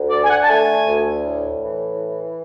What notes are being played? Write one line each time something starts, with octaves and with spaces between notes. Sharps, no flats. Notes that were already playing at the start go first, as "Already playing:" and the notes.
Already playing: D2
D3 D5
G#5
F#5
A5
A3 G#5
D2
A2
E3